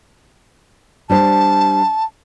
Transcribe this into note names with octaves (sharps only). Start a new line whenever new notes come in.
G3 D4 C5 A5